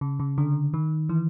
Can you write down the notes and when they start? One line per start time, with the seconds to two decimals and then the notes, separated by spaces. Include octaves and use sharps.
0.01 C#3
0.20 C#3
0.38 D3
0.74 D#3
1.09 E3